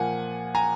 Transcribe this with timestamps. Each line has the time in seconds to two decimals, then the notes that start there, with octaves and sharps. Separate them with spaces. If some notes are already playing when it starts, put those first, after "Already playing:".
Already playing: A#2 F3 A#3 F#5 G#5
0.55 G#5 A#5